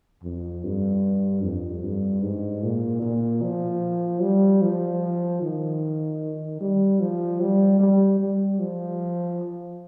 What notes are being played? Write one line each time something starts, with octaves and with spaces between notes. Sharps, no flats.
F2
G2
F2
G2
G#2
A#2
A#2
F3
G3
F3
D#3
G3
F3
G3
G3
G3
F3